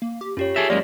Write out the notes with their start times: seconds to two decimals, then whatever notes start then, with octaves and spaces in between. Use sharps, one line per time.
0.02 A#3
0.21 G4
0.37 F#2 F4 G4 C#5
0.56 G#4 A4 E5 D7
0.70 F#2 G#3 A#3 D5